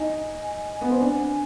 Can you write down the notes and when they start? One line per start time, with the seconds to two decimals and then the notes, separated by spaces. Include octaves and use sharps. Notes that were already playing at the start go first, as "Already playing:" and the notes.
Already playing: D#4 G#5
0.81 B3
0.90 C4
1.00 D4